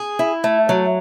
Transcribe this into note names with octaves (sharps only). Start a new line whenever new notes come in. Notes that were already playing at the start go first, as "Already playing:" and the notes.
Already playing: G#4
E4
A3
F#3